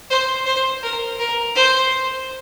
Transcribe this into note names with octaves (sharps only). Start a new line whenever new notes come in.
C5
C5
A#4
A#4
C5